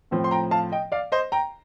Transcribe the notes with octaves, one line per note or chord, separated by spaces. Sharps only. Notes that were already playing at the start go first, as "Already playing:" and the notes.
A2 F3 C4
C6
G5 A#5
F5 A5
D#5 G5
D5 F5
C5 D#5
G5 A#5